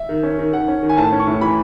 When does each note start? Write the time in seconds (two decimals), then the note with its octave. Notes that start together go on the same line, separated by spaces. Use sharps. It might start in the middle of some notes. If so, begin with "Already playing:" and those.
Already playing: E5
0.09 D#3
0.23 C#4
0.39 D#3
0.53 D#3 F#5
0.68 C#4
0.83 D#3
0.89 G#5
0.97 A2 A5
1.12 C#4
1.19 C#6
1.27 A2
1.41 E3 B5